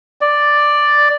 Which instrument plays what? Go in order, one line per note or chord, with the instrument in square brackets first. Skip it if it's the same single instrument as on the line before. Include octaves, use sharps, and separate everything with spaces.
[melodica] D5